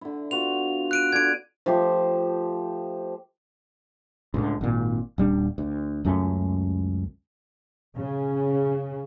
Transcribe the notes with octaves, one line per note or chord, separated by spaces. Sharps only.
D3 E4
B3 F4 F#4 F7
F#6 D7 D#7
D3 D4 G#6 D7
F3 A3 G4 C5
C#2 A2 D3
G#1 A#2
D#1 G3 D4
D2
C#2 F#2 A3 C#4
C#3